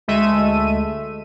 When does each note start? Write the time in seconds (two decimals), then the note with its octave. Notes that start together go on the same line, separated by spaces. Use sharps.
0.08 D2 G#3 A3 E5 D#7